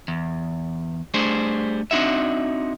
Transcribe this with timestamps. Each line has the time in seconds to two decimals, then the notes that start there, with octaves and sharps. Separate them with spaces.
0.08 E2
1.14 G3 A3 D4 G#4 C5
1.91 C4 D4 D#4 F#4 E5